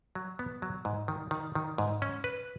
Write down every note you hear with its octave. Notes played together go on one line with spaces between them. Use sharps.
F#3
B3
F#3
G#2
D#3
D#3
D#3
G#2
C#4
B4